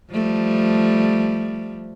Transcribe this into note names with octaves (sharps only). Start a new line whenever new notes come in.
F3 G3 A3